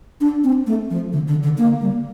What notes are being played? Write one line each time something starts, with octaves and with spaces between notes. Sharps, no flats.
D4
C4
A3
F3
D3
D3
D3
A#3
G3